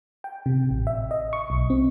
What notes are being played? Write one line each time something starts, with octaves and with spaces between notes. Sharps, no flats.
G5
C3
A1
E5
D#5
C#6
B1
C4